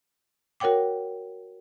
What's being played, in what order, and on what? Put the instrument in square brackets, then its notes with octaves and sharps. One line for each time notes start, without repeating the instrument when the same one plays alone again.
[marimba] F#4 A#4 C#5 F#5 G5 D6